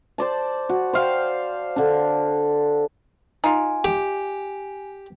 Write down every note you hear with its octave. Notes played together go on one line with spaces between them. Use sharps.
C5 D5 A5
F#4
C5 F5 G5
D3 D4
D#4 F4 G#5
G4